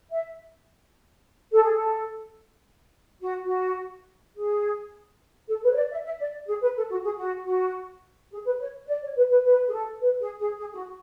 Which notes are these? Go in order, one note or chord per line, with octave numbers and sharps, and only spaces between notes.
E5
A4
G#4
A4
F#4
F#4
G#4
A4
B4
C#5
D5
E5
E5
D5
G#4
B4
A4
F#4
G#4
F#4
F#4
G#4
B4
C#5
D5
C#5
B4
B4
B4
G#4
A4
B4
G#4
G#4
G#4
G#4
F#4